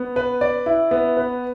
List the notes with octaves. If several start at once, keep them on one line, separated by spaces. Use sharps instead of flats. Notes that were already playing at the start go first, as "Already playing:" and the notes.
Already playing: B3
B4
D5
E4
B3
B4